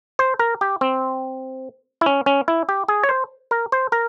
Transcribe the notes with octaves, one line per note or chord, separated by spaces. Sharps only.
C5
A#4
G4
C4
E4
C#4
C#4
E4
G4
G#4
C#5
C5
A#4
C5
A#4